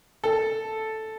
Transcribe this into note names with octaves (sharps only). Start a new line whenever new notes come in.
A4